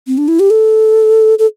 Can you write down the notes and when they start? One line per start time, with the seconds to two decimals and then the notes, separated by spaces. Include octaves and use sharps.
0.07 C4
0.18 D4
0.28 E4
0.39 G4
0.50 A4
1.39 A4